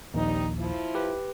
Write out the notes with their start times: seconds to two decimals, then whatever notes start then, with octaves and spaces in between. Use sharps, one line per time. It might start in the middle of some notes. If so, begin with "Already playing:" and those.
0.14 A#1 D#2 G3 C4 D#4
0.59 F3 E4
0.95 G4 B4